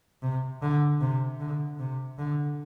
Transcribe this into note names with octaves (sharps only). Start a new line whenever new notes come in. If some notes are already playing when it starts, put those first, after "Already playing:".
C3
D3
C3
D3
C3
D3